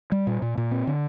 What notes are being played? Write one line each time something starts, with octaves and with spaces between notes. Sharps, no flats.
G3
A#2
A#2
A#2
C4
D3